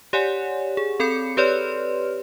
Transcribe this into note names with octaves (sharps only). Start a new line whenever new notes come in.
G4 C#5 D5 F#5 G#5
G#4
C4 A4 B5 G6 C#7
G4 B4 C#5 D5 C6 F6